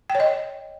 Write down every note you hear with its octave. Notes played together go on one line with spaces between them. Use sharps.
G5
C#5
D#5